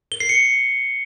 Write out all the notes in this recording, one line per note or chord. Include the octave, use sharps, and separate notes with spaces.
G7
C7
C#7